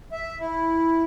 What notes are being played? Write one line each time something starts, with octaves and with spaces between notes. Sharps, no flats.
E5
E4